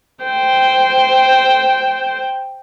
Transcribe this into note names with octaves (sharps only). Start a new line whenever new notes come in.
C5 G5